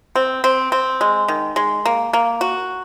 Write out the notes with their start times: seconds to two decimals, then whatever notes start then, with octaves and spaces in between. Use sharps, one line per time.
0.15 C4
0.44 C4
0.72 C4
1.01 G#3
1.28 D#3
1.56 G#3
1.85 A#3
2.13 A#3
2.41 F#4